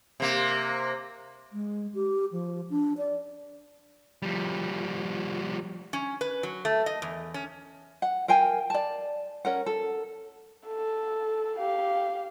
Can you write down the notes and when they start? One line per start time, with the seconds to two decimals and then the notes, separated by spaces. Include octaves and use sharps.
0.20 C3 A#3
1.53 G#3
1.94 G4
2.32 F3
2.70 D4
2.98 D5
4.22 F3 G3
5.93 C#4
6.21 B4
6.43 F#3
6.65 A3
6.86 D#5
7.02 E2
7.34 C#4
8.02 F#5
8.28 A#4 F5 G5 G#5
8.70 D5 A5
9.45 C#4 A#4 F#5
9.66 A4
10.67 A4
11.56 G4 F5